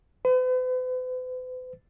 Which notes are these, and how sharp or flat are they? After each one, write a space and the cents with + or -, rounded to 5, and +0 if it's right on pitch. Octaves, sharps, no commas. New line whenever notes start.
B4 +45